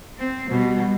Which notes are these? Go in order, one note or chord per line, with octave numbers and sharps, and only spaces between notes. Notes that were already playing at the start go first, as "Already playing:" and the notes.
C4
B2 G3